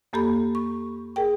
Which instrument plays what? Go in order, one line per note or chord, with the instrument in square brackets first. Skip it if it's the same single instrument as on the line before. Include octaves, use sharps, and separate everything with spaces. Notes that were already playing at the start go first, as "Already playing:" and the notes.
[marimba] F2 A#3 G4 A4 B5
C#6
G#4 A#4 G5